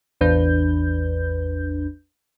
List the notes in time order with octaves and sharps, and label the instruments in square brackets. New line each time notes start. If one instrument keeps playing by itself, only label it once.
[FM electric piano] A1 E2 D4 B4 G6